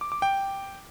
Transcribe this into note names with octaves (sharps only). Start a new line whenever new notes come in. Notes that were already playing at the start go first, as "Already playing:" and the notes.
D6
D6
G5